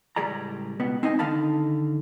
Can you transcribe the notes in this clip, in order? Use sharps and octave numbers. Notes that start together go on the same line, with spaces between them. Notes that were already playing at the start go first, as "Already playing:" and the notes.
C#2 A2 G3 G#4 D5 A#5
C#2 B2 B3
C4 D#4 E4 D#5 F5 G#5
D3 D#3 D#4 F5 A5 B5